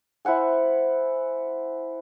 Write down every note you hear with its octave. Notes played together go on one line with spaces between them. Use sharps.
E4 C5 F#5 G#5